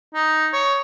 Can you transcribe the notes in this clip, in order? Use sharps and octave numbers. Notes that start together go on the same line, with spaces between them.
D#4
C#5